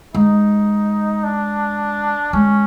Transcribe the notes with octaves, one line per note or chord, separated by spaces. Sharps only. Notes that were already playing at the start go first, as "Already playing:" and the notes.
G#3 D#4
D4
G#3 C#4